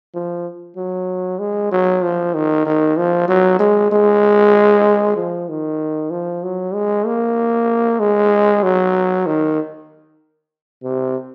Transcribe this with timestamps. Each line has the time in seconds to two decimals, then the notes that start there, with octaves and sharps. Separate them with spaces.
0.14 F3
0.76 F#3
1.39 G#3
1.71 F#3
2.02 F3
2.34 D#3
2.66 D#3
2.97 F3
3.28 F#3
3.59 G#3
3.91 G#3
5.16 F3
5.49 D#3
6.10 F3
6.43 F#3
6.74 G#3
7.06 A#3
7.99 G#3
8.63 F#3
9.26 D#3
10.83 C3